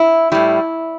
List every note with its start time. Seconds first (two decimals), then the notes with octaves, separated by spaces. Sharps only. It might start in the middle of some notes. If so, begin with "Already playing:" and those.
Already playing: E4
0.32 A2 G3 E4